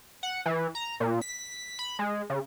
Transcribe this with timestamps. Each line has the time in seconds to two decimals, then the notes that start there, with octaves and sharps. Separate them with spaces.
0.23 F#5
0.46 E3
0.75 A#5
1.00 A#2
1.22 B6
1.79 B5
1.99 G#3
2.30 C#3